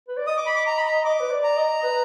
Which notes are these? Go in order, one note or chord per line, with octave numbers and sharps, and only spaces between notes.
B4
D5
D#5 D#6
D6
B5
D6
A#5
B5
A#5
D#5 D6
B4
D5
A#5
D#5
B4